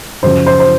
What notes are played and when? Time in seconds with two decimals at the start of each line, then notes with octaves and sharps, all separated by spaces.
0.23 F#2 C#3 F3 C5
0.47 C5
0.60 C5